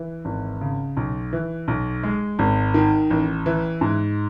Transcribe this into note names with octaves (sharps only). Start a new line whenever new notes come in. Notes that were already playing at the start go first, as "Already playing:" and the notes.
Already playing: E3
G#1
C#3
B1
E3
B1
G#3
G#1
D#3
A1
E3
G#2